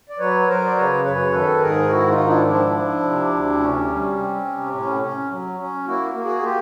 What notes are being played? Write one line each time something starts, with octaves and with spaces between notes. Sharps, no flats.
D5
F#3 B4 C#5
F#3 A#4 C5
D5
C#3 B4 C#5
F#2 B4 C#5
D#3 A4 B4
G#2 G#4 A#4
D#3 E4 F#4
D#4 F4
G#2
D4 E4
F3 D4 E4
F3
C3
D2
C3 C#4
G3
C4
C3
A2 C#4
C#4
F#3
C#4
A#3 E4 F#4
A#3
F#4 G#4
A#3 F4 G4